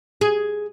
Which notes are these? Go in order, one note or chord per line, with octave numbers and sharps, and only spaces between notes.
G#4